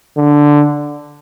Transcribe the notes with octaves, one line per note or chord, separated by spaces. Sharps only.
D3